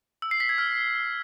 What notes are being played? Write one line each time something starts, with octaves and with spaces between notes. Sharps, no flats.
E6
C7
B6
G#6
F6